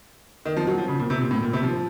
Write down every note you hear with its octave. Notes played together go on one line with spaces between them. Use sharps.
D#3
F3
F#3
F3
C#3
A#2
C3
A#2
A2
A#2
C3
F3